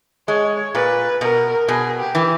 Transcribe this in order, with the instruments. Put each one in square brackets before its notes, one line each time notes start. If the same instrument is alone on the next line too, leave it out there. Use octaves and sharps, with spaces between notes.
[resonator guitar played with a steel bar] G#3 [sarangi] C#5
[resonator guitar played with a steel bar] A#2 [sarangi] B4
[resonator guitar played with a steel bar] B2 [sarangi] A#4
[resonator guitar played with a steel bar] B2 [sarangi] G#4
[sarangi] G4
[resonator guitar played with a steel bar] E3